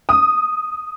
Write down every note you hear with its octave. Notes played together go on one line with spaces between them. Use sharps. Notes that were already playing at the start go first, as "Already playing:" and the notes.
D#6